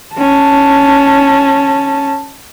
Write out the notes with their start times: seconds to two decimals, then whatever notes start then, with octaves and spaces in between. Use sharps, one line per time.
0.15 C#4 A5